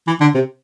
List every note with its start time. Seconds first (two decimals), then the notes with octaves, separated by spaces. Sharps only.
0.07 E3
0.21 D3
0.34 C3